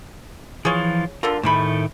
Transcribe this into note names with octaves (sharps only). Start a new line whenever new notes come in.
E3 F3 F4 G#4 C#5
D3 F4 A4 A#4
A2 C3 D#3 G#3 A3 B5